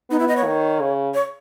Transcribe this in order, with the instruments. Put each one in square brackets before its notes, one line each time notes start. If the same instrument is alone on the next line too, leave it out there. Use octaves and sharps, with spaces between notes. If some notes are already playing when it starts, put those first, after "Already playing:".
[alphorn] B3 [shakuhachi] D#4
[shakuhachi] E4
D#5
C#5
[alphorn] D#3
C#3
[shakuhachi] C#5